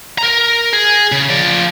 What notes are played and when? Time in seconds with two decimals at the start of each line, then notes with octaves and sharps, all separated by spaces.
0.18 A#4 A#5
0.73 G#4
1.12 C#3
1.29 F3 D5